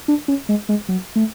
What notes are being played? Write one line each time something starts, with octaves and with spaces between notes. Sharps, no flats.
D4
C#4
G#3
G#3
F#3
A3